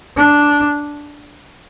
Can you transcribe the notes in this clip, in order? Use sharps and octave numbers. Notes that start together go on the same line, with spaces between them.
D4